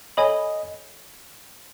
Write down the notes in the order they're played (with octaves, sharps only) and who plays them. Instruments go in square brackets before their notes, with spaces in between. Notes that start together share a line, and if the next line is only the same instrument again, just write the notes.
[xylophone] A4 C#5 G#5 B5 [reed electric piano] D#5